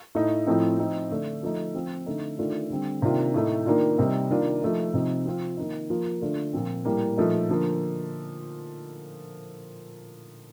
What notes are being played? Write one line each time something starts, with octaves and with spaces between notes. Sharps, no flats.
A2 A3 D#4
A2 F3 A3 C4 D#4
F3 C4 D#4
D3 A3 D4
F3 A3 D#4
F3 C4 F4
D3 A3 D#4
D#3 A3 D4 F4
D3 G3 C4
C3 D#3 A#3 D4 F4
A2 A3 D#4
D#3 A#3 D4 F4
C3 G3 C4 D#4
D#3 A#3 D4 F4
F3 A3 D#4
C3 F3 C4 D#4
F3 C4 F4
D#3 A#3 D#4
F3 A#3 F4
D3 A3 D4 F4
A#2 F3 C4
A2 G3 A#3
A#2 F3 A3 D#4
D3 F3 A#3